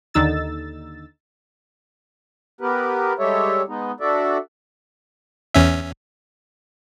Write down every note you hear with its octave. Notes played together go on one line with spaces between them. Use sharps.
D#2 D3 D#4 E6 A6
B3 G4 A#4 B4
G3 G#3 G4 A4 C#5 E5
G#3 B3 D#4
D4 F#4 A4 D5 E5
E2 C#4 E5